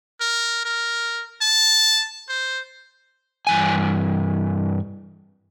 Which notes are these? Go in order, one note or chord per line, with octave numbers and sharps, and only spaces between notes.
A#4
A#4
A5
C5
G2 E3 G#5